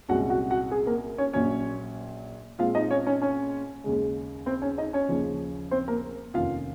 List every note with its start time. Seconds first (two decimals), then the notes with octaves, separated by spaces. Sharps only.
0.09 C2 A#2 G#3 C#4 F#4 F#5
0.30 F#4 F#5
0.50 F#4 F#5
0.71 G#4
0.87 A#3 A#4
1.18 C#4 C#5
1.33 A#1 A#2 F#3 C#4 C#5
2.59 A#2 G#3 C4 F4 F5
2.75 D#4 D#5
2.91 C#4 C#5
3.07 C#4 C#5
3.22 C#4 C#5
3.84 D#2 C#3 G#3
4.46 C4 C5
4.62 C#4 C#5
4.78 D#4 D#5
4.93 C#4 C#5
5.09 D#2 C#3 F3
5.71 C4 C5
5.88 A#3 A#4
6.34 F1 D#2 D#3 A#3 C#4 F4 F5